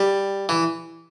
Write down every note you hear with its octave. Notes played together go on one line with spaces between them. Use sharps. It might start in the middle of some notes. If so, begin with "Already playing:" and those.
Already playing: G3
E3